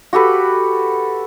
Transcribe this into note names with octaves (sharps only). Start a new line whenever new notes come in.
F#4 G4 A4 B4